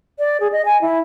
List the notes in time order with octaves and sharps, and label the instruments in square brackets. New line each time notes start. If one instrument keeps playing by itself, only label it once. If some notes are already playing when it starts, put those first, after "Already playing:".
[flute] D5
G#4
D#5
G#5
E4